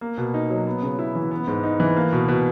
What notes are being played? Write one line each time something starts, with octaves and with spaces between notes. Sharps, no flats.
A#3
B2
D#4
F#3
B3
C#3
E4
E3
B3
G#2
D#4
E3
A#3
B2
B2